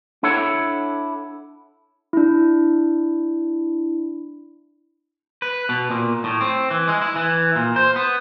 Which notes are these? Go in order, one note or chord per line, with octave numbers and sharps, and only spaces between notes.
D4 E4 A4 C#5 F#5
D4 E4
B4
B2
A#2
A2
C4
E3
G#3
E4
E3
A#2
C5
B3